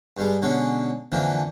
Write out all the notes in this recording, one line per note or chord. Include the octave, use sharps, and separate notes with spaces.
G2 G3 G#3
B2 D3 G#3 C#4
F2 A#2 D3 E3 F3